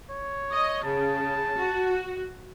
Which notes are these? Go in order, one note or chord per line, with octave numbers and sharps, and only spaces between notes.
C#5
D#5
C#3 A5
F#4